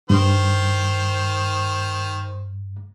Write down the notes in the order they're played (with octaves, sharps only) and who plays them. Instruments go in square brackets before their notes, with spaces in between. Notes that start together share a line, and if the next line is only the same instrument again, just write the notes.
[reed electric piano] G2 [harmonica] D#3 C5